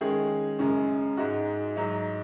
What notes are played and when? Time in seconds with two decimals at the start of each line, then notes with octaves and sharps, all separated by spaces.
0.01 D#3 G#3 C#4 G#4
0.59 F#2 C#3 G#3 C#4
1.17 G#2 G#3 D#4 F#4
1.76 G#2 F#3 D#4